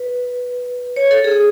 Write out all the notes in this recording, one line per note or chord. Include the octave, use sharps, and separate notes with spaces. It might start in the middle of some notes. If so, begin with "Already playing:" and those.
Already playing: B4
C#5
A4
G#4